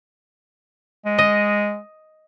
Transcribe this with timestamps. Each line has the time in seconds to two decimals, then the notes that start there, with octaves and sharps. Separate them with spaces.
1.05 G#3
1.18 D#5